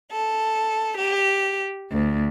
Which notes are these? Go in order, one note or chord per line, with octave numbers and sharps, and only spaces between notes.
A4
G4
D2